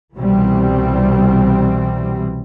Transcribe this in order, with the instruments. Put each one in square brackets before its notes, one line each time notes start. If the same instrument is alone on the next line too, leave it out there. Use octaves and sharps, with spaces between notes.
[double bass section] C2 B2 E3 G3 C4